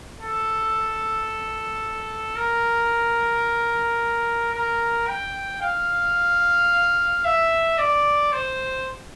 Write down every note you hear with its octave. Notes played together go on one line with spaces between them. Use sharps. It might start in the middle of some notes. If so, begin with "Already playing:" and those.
A4
A#4
A#4
G5
F5
E5
D5
C5